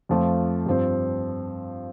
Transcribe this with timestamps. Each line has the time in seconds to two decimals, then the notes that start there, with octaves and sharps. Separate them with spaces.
0.09 F2 F3 A3 F4
0.66 G2 F3 C4